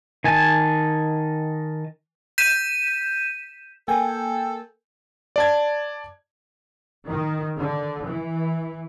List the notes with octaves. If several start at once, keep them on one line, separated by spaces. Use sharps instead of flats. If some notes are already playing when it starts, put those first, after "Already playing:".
D#3 G#5 A5
G6 B6 D#7 E7
A#3 A4 G5 G#5
D5 A5 G#6
D#3
D3
E3